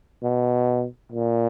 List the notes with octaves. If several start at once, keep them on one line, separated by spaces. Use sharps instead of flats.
B2
A#2